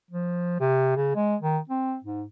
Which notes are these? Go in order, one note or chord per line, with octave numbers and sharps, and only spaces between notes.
F3
C3
C#3
G#3
D#3
C4
G#2